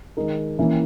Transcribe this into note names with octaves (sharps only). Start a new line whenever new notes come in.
D#3 G#3 D#4 A#4
E3 A#3 C#4 E4